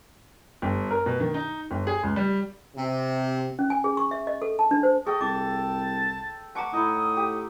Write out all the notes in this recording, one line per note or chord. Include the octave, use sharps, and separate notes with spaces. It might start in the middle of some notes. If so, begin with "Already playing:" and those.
G1
A#4
B2
D#3
D#4
G1
G#4
C#2
G3
C3
C#4
G#5
G#4
C#6
E5
D#5
A4
A5
D4
C5
G#4 A4 D#5 G5
C2 A5 D6
F#5 A5 A#5 C#6 D6
A2 D#4 E4 D#6
G4